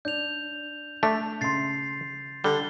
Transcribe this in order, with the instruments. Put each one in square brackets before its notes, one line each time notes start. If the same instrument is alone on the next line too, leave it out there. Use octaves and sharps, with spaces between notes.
[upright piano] D4 [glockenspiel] G6 F7
[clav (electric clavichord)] A3 D4 [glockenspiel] B6
[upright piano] C#3 C6 [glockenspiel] A6 C7
[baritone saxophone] D3 [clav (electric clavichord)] G3 [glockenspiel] G7